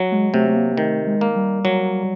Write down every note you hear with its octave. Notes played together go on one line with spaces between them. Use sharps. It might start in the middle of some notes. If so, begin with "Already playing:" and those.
Already playing: F#3
G#3
C3 A3
A3
A#3
A#3
D#3 A3
G#3
A#3
G3
F#3